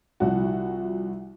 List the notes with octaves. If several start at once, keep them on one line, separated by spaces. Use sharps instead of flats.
C2 F3 F#4